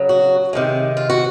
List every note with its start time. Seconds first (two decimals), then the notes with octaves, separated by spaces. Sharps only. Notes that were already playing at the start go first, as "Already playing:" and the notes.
Already playing: C#3 F#3
0.09 F#4
0.53 C3 D#3 G#3
0.97 F4
1.10 F#4